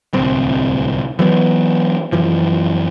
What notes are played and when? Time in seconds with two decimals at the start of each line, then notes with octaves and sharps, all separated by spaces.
0.13 D1 C2 C4
1.19 E3 F#3 B3
2.12 F#2 E3 F3